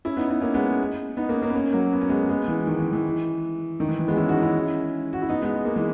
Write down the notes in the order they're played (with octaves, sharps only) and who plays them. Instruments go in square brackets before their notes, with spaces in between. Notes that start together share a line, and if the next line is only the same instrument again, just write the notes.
[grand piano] C#4 E4
B3 D#4
B3 D#4
A#3 C#4
G#3 B3
B3 D#4
A#3 C#4
A#3 C#4
B3
A#3 C#4
F#3 A#3
B3
C#4
G#3 B3
G#3 B3
E3
D#3
E3
E3
D#3
E3
E3
G#3 B3
C#4 E4
D#4 F#4
C#4 E4
F#4
E4
B3 D#4
G#3 B3
G#3
A#3
E3 G#3